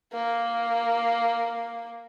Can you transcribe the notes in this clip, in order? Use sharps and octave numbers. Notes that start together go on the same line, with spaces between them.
A#3